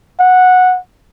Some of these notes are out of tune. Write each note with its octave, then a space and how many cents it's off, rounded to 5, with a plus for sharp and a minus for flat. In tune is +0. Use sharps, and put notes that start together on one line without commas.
F#5 -10